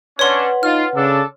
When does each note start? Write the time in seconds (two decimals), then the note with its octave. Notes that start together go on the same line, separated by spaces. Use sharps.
0.19 C#4 D4 B4 C#5 F#5 C6
0.63 D#4 F4 F6
0.96 C#3 D4 A4